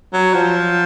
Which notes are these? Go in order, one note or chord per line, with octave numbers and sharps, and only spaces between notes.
F#3
F3